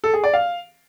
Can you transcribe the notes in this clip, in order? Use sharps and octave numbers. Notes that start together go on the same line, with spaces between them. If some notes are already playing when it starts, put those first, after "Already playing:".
A4
G#4
D5
F5